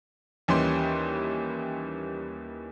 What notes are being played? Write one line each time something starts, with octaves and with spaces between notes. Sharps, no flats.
D#2 E3 G3 C#4 G4 C6